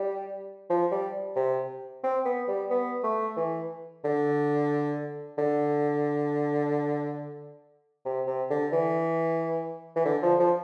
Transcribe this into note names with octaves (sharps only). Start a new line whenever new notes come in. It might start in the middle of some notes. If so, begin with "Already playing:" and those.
Already playing: G3
F3
G3
C3
C4
B3
G3
B3
A3
E3
D3
D3
C3
C3
D3
E3
E3
D3
F3
F3